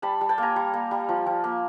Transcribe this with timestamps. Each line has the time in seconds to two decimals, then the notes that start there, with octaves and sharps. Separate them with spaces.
0.02 G3 A5 B5
0.21 G3
0.29 G5 A5
0.38 A#3 G#5 A#5
0.56 G3
0.74 A#3
0.91 G3
1.09 F3
1.26 F3
1.44 A#3